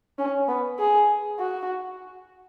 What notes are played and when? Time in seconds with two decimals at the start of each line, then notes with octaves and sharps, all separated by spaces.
0.19 C#4
0.48 B3
0.79 G#4
1.39 F#4